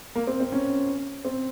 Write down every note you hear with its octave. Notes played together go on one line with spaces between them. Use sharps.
A#3
C4
C4
C#4
C4